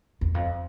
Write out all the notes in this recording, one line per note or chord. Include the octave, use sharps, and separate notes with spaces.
E2
F2